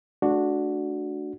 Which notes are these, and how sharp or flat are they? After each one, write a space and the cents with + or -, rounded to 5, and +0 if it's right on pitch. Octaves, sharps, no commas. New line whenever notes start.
A3 -35 D4 +0 F#4 -5